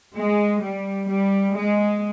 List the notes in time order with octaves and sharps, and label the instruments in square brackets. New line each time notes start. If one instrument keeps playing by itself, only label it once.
[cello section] G#3
G3
G3
G#3